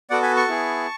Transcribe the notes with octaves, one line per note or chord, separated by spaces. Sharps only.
B3 F#4 A4 D5 F#5
G#5 B5
A5 C#6
B3 E4 G#4